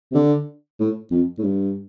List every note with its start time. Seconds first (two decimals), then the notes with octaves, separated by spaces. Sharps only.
0.11 C3
0.15 D3
0.80 A2
1.11 F2
1.38 A2
1.44 G2